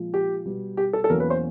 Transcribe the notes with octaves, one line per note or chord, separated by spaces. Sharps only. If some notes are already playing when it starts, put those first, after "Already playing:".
Already playing: A#2 F3 G#3
G4
B2 G3 B3
G4
A4
A4
E2 B2 F#3 A#3 C#4 A#4
B4
C5